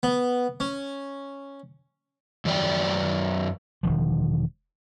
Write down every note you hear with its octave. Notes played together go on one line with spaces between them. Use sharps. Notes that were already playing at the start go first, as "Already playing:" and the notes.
B3
C#4
F#2 D#3 F#3 D5 G5
E1 D#3 F3